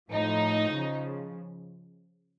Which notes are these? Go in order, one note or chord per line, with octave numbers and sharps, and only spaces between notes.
A2 F3 D#4
C#3 F3